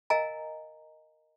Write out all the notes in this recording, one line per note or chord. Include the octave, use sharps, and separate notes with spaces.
A#4 D#5 F5 G#5 A#5